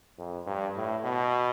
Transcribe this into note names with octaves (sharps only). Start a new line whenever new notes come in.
F2
G2
A2
B2